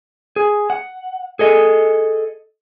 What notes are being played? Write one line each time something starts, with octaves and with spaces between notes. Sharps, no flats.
G#4
F#5
G#4 A4 D#5